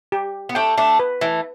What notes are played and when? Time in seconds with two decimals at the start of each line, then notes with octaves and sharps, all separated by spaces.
0.12 G4
0.49 B3
0.55 A3 D4 G5
0.78 A3 D4
0.99 B4
1.21 E3 A3